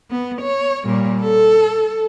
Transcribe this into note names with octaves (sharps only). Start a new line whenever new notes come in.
B3
C#5
A#2 G3
A4